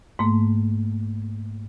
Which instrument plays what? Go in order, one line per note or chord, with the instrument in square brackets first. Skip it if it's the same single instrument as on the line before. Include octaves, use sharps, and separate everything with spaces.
[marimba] G#2 A3 A#3